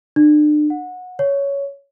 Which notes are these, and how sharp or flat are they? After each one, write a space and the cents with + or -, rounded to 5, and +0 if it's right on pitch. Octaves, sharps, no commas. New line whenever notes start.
D4 +40
F#5 -20
C#5 +10